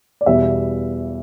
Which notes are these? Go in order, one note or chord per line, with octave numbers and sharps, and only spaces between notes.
D5
E2 B2 G3 E5